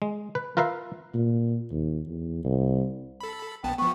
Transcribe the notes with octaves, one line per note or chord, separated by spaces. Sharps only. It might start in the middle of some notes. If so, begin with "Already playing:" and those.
G#3
B4
F4 A#4 B4 E5 F5
A#2
D#2
E2
C2
A4 B5
A#1 B3 G5 A5
F3 B3 C#6